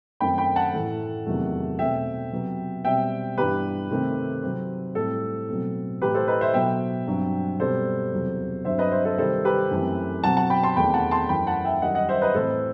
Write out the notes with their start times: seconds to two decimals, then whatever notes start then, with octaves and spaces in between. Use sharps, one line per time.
0.20 F#2 D#3 A3 C4 G5 B5
0.38 G5 B5
0.56 F#5 A5
0.73 A2 E3 A3
1.26 E2 C3 D#3 F#3 A3
1.79 B2 A3 C4 E5 G5
2.32 C3 F#3 B3
2.85 B2 G3 C4 E5 G5
3.37 G2 E3 G3 B3 G4 B4
3.90 C3 D#3 A3 C4
4.43 C3 F#3 C4
4.95 A2 G3 C4 A4
5.49 B2 F#3 A3 C4
6.02 A2 E3 A3 G4 B4
6.14 A4 C5
6.28 B4 D#5
6.41 C5 E5
6.54 B2 F#3 B3 E5 G5
7.07 G2 F#3 C4
7.60 B2 G3 C4 A4 C5
8.12 E2 C3 F#3
8.65 G2 F#3 C4 C5 E5
8.79 B4 D#5
8.91 C5 E5
9.05 A4 C5
9.18 C3 D#3 G3 C4 A4 C5
9.44 G4 B4
9.71 F#2 E3 A3 C4
10.23 B2 F#3 C4 F#5 A5
10.37 F#5 A5
10.50 G5 B5
10.63 A5 C6
10.76 E2 D#3 A3 C4 G5 B5
10.94 F#5 A5
11.11 A5 C6
11.29 F#2 E3 A3 C4 G5 B5
11.47 F#5 A5
11.65 E5 G5
11.82 F#2 D#3 G3 D#5 F#5
11.95 D#5 F#5
12.09 C5 E5
12.22 B4 D#5
12.34 A2 E3 A3 C4 A4 C5